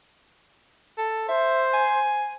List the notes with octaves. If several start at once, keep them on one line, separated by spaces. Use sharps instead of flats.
A4
C5 E5
G#5